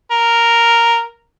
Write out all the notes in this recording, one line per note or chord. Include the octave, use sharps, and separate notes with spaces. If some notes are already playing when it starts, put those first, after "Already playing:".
A#4